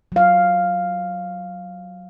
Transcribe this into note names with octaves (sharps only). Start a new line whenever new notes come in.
F#3 F5